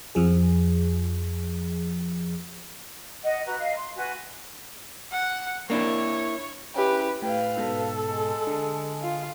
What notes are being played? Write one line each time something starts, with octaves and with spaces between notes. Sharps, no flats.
F2 F3 G#4
D#5 F#5
F#4 B4 A#5
D#5 F5
C6
F#4 B4 G#5
F#5
A#3 D4 E4 C#5
C#4 E4 G4 B4
A2 B4 F5 G5
G#2 B2 A4
G#3
D3
F4